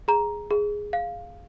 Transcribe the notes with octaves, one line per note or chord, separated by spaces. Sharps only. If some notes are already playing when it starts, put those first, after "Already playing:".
G#4 A#5
G#4
F5